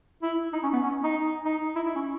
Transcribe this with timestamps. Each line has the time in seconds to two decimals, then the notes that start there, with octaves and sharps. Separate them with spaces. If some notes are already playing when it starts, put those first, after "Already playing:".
0.23 E4
0.53 D#4
0.63 C#4
0.73 B3
0.84 C#4
1.04 D#4
1.45 D#4
1.76 E4
1.86 E4
1.95 C#4